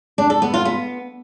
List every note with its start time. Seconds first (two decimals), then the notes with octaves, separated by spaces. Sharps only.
0.18 D4
0.30 A4
0.42 B3
0.54 F4
0.65 B3